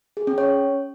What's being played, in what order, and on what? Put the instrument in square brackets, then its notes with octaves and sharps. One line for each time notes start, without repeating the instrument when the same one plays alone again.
[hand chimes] G#4
C#4
C#5